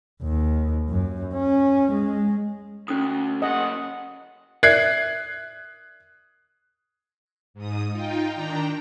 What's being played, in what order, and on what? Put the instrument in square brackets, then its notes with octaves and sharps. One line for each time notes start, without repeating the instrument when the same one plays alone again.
[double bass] D#2
F#2
C#4
G#3
[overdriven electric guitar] D2 [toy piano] C#4 D#6
[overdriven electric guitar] F#2 C#3 [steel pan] D#5 [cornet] F#5
[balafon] A#4 D5 E5 [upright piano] F#6 G#6 C7
[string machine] G#2 D#6
D#4 F4 G5
D#3 D4 G5 A#5